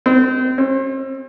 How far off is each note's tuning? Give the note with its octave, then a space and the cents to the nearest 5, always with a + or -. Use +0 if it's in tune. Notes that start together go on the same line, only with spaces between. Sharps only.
C4 -30
C4 +40